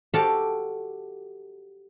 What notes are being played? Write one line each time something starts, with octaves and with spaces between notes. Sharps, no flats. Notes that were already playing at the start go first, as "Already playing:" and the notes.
F#4 G4 A4 D5 F5